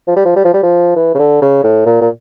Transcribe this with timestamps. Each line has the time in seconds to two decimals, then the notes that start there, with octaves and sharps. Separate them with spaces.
0.07 F3
0.16 G3
0.26 F3
0.36 G3
0.45 F3
0.54 G3
0.63 F3
0.96 E3
1.15 C#3
1.19 D3
1.42 C#3
1.64 A2
1.86 A#2
2.01 A#2